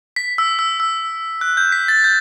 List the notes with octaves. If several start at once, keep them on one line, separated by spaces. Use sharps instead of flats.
B6
E6
E6
E6
F#6
G6
B6
A6
G6